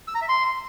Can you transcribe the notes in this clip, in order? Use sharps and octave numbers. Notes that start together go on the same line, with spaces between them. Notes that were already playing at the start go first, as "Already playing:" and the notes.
E6
A#5
E5
C6